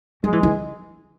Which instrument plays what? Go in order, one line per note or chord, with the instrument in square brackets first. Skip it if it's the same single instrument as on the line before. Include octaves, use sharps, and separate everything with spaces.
[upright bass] F#3 [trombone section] G#3
[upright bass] E3
E3